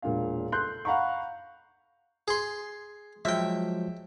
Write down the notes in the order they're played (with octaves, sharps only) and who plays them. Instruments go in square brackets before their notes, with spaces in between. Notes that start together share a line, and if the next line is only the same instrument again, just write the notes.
[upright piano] E1 A#2 D4 F5
A4 C6 F#6 G6
F5 F#5 A#5 B5 C#6
[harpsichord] G#4 C6
[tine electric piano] F3 F#3 G#3 [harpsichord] E5 G5